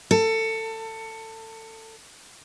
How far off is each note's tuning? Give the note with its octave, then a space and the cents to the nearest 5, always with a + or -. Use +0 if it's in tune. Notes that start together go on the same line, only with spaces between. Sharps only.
A4 +25